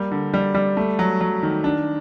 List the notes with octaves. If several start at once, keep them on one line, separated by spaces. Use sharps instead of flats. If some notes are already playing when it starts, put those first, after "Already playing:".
Already playing: G3 A#3
D3
G3
G3
A3
F#3
F#3
D#3
D4